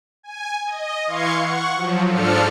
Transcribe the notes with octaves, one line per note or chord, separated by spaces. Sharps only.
G#5
D#5
E3 F5 C6 C#6 G#6 C#7
F#5 C#6
F3 F#3
G#2 F3 D4 A4 F6 C#7